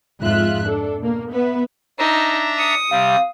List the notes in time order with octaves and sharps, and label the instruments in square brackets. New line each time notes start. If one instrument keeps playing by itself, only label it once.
[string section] F2 G#2 G#3 F4 E5 F#6
D4 A4
B2 A#3
B3 B4 E5
[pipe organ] D4 E5 A#5 [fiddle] D#4
[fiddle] D#6 [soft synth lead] C#7
[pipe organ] C3 G3 [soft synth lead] F5